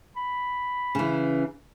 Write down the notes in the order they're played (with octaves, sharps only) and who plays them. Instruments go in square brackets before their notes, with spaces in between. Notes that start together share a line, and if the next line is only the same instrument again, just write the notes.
[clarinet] B5
[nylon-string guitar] C#3 E3